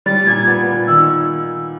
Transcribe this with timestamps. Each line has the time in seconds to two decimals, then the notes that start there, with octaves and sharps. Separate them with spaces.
0.06 G3 A6
0.27 A#2 G#6
0.47 B3
0.67 A#2
0.88 D#3 E6